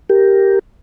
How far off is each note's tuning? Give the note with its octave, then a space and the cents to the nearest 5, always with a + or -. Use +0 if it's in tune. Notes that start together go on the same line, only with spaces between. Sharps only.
G4 +0 A#4 +0